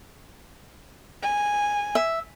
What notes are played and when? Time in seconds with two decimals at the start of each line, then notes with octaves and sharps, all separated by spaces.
1.23 G#5
1.95 E5